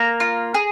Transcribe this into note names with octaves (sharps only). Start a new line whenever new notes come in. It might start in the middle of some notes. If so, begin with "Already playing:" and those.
Already playing: A#3 A#5
F4
G#4